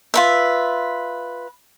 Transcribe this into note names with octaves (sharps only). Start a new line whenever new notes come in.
F4 B4 E5